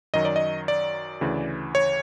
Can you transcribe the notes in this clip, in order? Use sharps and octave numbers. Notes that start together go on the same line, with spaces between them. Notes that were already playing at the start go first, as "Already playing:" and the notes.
F#2 D#3 F#3 D#5
D5
D#5
D5
D2 C#3 E3
C#5